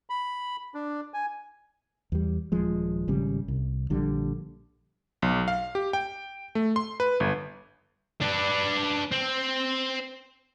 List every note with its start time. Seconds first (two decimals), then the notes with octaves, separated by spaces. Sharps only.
0.10 B5
0.75 D4
1.14 G#5
2.12 E2 G3
2.52 D#1 F3 G#3
3.08 G#1 C#3 G3
3.48 C2
3.90 A#1 D3 G3
5.22 B1
5.48 F5
5.75 G4
5.93 G5
6.55 A3
6.76 C6
7.00 B4
7.20 G1
8.22 D4 B4
9.12 C4